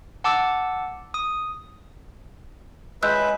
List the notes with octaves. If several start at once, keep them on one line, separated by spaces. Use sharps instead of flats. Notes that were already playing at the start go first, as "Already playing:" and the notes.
F#5 A5 D6 E6
D#6
G#3 B4 E5 E6 F#6 G6